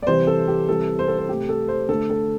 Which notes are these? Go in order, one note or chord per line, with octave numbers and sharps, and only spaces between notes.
D5
C3 E3 G3 C5
A4
G4
C3 E3 G3 A4
C5
A4
C5
C3 A3 G4
A4
C5
D3 A3 A4
A4